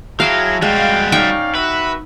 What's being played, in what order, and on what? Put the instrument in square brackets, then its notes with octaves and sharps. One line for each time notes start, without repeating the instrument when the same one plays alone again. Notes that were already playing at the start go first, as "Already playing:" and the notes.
[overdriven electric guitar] F#3 [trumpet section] E4 G#4 [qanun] F5 G5 A5
[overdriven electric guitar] G3 F#4 [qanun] G#3 [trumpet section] F5 G5
[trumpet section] C#4 D5 F5 [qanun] D#4 G5 C#6
[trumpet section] F#4 E5 [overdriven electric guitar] B4